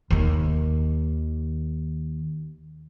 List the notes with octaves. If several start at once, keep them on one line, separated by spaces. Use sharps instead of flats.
D#2 D#3